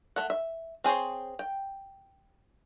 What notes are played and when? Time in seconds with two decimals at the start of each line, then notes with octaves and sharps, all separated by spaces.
0.16 A3 F#5
0.30 E5
0.84 C4 G#4 C5 C#5
1.39 G5